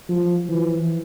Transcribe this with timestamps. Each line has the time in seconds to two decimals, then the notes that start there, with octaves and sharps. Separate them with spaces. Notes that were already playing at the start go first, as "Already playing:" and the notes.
0.09 F3
0.49 E3